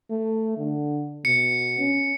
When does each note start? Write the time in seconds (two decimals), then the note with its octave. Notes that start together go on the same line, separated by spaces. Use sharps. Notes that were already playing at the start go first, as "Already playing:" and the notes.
0.10 A3
0.57 D3
1.25 B2 C#7
1.79 C#4